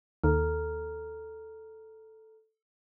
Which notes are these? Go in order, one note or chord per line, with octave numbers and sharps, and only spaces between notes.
D#2 A4 A#5 F6